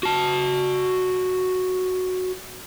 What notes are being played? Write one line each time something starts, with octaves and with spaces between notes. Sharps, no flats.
F#4 A5